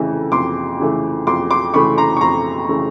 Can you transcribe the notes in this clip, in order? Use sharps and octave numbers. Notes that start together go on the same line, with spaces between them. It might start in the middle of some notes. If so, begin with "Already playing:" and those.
Already playing: F2 C#3 E3 A3
F2 C6 D6
C#3 E3 A3
F2 C6 D6
C6 D6
C#3 E3 A3 B5 C#6
A#5 C6
C#6
F2 A#5 C6
C#3 E3 A3